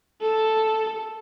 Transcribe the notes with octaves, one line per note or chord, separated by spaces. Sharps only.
A4